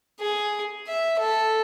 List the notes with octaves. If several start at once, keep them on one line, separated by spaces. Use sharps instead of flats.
G#4
E5
A4